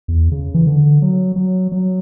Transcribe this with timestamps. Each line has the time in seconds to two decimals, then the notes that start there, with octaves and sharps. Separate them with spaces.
0.08 E2
0.32 C#3
0.54 E3
0.67 D3
1.02 F#3
1.36 F#3
1.72 F#3